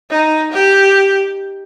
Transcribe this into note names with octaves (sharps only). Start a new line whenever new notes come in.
D#4
G4